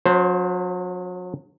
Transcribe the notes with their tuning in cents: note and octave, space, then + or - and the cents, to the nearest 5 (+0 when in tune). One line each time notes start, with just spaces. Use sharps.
F#3 -40 C#4 +0 C5 +0